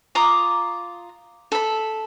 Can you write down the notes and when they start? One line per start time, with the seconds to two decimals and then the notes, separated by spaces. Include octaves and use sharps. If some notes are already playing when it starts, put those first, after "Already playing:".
0.15 F4 A#5 D6 D#6
1.52 A4 B5